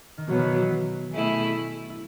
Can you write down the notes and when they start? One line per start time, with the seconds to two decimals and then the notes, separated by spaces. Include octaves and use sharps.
0.18 D#3
0.27 B2 E3 F#3 B3
0.38 D#3
0.48 E3
0.59 F#3
1.13 B2 A3 E4 G#4
1.55 E4
1.90 E4